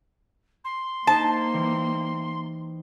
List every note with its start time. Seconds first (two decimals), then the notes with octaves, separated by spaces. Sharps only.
0.64 C6
1.07 A#3 D#4 C5 A5
1.53 E3 G3